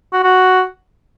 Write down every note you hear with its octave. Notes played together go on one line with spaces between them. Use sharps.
F#4
F#4